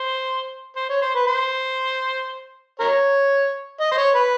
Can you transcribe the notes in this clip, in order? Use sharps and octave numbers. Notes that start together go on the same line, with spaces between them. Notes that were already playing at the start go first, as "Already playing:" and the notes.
Already playing: C5
C5
C#5
C5
B4
C5
A#4 C#5
D#5
C5
C#5
B4